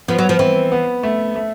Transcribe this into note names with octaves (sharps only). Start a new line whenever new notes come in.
F3 B3
F#3
F3
E3 C4
B3
A3
A3